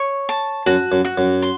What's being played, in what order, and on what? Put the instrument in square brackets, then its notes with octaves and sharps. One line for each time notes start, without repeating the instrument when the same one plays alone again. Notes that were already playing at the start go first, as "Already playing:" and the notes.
Already playing: [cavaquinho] C#5
A5
[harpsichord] F#2 [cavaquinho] F#4
[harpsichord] F#2
[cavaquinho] F#4
[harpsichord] F#2
[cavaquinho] C6